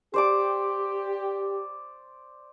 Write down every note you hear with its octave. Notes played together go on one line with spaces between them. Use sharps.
G4 C5 D5 D6